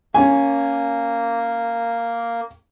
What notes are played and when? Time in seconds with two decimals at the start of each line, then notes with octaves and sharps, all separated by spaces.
0.14 A#3 C#4 G#5